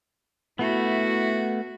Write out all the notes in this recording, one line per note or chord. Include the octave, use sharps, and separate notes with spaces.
A3 B3 E4 F#4